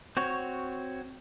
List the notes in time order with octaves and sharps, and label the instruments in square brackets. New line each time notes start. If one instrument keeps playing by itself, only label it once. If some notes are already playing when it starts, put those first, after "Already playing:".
[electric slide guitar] C4 F#4 C#5